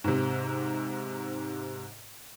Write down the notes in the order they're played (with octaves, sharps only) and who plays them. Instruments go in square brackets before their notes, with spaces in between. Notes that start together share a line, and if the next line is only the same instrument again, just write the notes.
[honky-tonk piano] G#2 C3